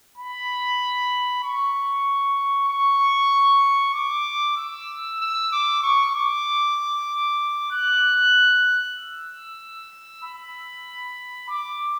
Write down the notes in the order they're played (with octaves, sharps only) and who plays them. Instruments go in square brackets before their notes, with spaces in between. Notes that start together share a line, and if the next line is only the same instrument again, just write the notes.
[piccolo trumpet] B5
C#6
C#6
D6
E6
E6
D6
C#6
D6
F#6
E6
B5
D6